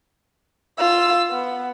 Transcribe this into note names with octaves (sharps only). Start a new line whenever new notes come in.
F4 E6
B3